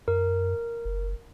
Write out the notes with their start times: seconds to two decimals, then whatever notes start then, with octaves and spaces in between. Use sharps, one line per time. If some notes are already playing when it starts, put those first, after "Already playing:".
0.08 F#2 A#4
0.85 F#1